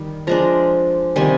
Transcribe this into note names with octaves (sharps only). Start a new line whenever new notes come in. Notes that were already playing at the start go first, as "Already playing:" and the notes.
Already playing: D#3 G3
F3 G#3 D4 A#5
C3 D#3 G3 G#5